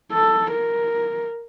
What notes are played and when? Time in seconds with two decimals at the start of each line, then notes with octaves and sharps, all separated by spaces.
0.13 A4
0.51 A#4